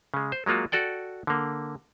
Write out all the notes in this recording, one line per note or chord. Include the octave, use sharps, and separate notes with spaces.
C#3 G#3
C5
F#3 G#3 A#3 F4 F#4
F#4 A4 D5 G5
D3 A#3